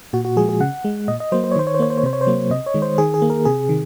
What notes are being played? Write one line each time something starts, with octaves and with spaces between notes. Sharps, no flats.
A#2 F#4
F#4
F3 G#3 G#4
G#4
C#3 F#5
G#3
A#2 D#5
D#5
F#3 A#3 C5
C5
C#5
D#3 C5
C#5
C5
A#3 C#5
C5
C#5
C3 C5
C#5
C5
F#3 A#3
C3 D#5
C#5
D#3 G#3
C5
D#3 G#4
G#4
A#3
A#4
C3 G#4
D#3